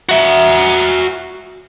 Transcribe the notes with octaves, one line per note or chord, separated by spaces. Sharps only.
F#4 E5